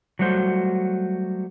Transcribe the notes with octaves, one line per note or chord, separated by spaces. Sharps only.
F#3 G3 A3 F#4 C5